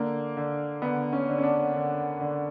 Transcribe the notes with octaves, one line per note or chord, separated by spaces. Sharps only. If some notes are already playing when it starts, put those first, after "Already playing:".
Already playing: D3 A#3
D3
D3 B3
C#4
D3
C#4
D4
D3
D3